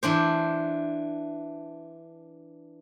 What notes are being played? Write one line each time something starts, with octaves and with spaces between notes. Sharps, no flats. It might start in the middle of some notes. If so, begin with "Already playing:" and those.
E3 D4 C5